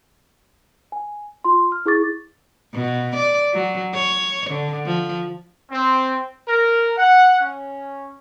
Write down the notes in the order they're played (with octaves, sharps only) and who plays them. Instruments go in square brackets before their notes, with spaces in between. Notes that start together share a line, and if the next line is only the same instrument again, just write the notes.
[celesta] G#5
F4 C6
F6
E4 G#4 C#6 D6 A6
[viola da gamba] B2
D5
F#3
C#5
D3
F3
[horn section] C4
A#4
F#5
C#4